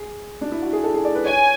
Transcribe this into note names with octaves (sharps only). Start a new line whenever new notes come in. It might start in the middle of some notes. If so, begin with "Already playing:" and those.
Already playing: G#4
D4
E4
F#4
G#4
A4
G#4
D5
B4
C#5 G#5